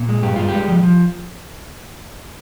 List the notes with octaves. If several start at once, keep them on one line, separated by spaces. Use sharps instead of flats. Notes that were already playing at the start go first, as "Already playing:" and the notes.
Already playing: A#2
G#3
G2 G4
G2 F4
G#3 G4
F3
F3